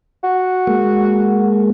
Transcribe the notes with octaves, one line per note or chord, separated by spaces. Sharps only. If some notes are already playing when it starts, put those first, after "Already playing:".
F#4
G#3 A#3